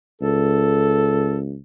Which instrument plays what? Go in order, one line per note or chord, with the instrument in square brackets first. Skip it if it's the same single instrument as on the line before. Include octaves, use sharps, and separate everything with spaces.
[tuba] C#2 [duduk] A4